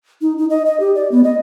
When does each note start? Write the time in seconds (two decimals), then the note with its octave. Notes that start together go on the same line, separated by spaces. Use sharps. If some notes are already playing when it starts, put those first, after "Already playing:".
0.22 D#4
0.38 D#4
0.50 D#5
0.65 D#5
0.80 G4
0.96 D5
1.12 B3
1.24 D#5